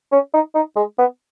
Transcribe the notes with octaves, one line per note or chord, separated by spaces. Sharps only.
C#4
D#4
D#4
G#3
B3